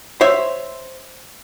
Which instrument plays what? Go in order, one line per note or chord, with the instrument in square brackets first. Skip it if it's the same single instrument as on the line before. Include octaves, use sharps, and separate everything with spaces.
[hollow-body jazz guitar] C5 C#5 E5